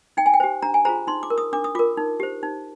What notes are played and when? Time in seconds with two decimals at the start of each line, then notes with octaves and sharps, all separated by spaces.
0.17 D#4 G5
0.26 G#5
0.34 G5
0.40 G4 C5
0.62 D4 A#5
0.74 G#5
0.85 F4 G#4 C5 A#5
1.07 D#4 C6
1.23 D6
1.30 A#4
1.38 D#6
1.53 D4 D6
1.64 D#6
1.75 F4 A#4 D6
1.97 D#4
2.20 G4 C5
2.43 D#4